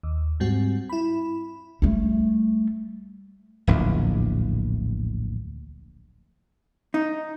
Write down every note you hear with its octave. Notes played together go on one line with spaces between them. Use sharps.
D#2
G#2 G3 C4 F#4
E4 B5
G3 A3
D1 A#1 E2
D#4